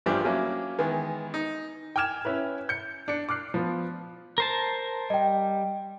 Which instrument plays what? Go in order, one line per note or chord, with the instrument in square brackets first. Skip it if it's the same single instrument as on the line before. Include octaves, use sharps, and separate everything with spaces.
[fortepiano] A1 G2 E3 F3 D4 G4
F#3 A#3 C#4 E4
D#3 E3 G#3 B3
D#4
[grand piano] G5 G#5 D6 F6 G#6 E7
C#4 E4 B4
G6 C#7
D4 C#7
D6 F6 F#6 C7
F3 B3
[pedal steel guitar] A#4 C5 A5
[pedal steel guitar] G3 [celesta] D#5 G5